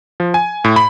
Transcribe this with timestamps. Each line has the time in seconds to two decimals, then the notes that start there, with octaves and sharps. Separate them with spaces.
0.20 F3
0.34 G#5
0.64 A2
0.76 B5